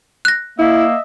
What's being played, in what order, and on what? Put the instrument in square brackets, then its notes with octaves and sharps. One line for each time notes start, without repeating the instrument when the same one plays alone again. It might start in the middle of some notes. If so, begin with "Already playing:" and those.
[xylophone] F#6 A#6
[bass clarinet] A#3 [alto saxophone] E4 [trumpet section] D#5 E5